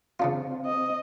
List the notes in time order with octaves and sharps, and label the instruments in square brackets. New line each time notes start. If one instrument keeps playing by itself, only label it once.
[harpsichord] C#3 D4 F4 [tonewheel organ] C4
[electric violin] D#5